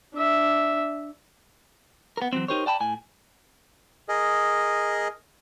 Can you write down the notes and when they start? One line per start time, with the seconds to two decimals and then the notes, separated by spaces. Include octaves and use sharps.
0.14 D4 E5
2.17 B3 A#4
2.33 E3 F#3 C4
2.48 D#4 G4 A#4 C5 C#5
2.66 D5 G5 A5 B5
2.80 A2 G#5
4.09 G#4 A#4 D#5